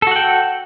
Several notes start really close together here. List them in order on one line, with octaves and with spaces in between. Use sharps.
A4 F#4 F#5 G5